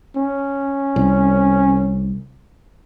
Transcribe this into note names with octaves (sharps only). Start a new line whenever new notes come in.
C#4
C2